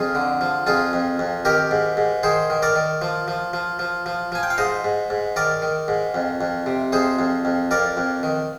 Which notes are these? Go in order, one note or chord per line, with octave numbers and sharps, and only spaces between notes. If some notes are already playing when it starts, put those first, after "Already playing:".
Already playing: F2 F4 G#4
D3
F3
F2 F4 G#4
F2
F2
D#3 G4 A#4
G#2
G#2
D#3 G#4 C5
D#3
A#4 D5
D#3
F3
F3
F3
F3
F3
F3 G#5
G5
F5
G#2 C5 D#5
G#2
G#2
D#3 A#4 D5
D#3
G#2
F2
F2
C3
F2 G#4 C5
F2
F2
F2 A#4 D5
F2
D#3